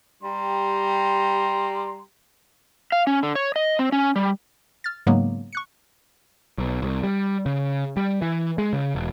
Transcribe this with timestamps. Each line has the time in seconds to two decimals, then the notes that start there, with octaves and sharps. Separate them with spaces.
0.22 G3 G4 A#5 C6
2.92 F5
3.07 C#4
3.23 D3
3.35 C#5
3.56 D#5
3.79 C4
3.92 C#4
4.16 G3
4.84 F6 A6
5.07 G#2 C#3 F#3 G#3 A#3 B3
5.53 C#6 F#6 C#7
6.58 B1
6.82 C2
7.03 G3
7.46 C#3
7.97 G3
8.22 E3
8.58 G#3
8.73 C#3
8.95 E1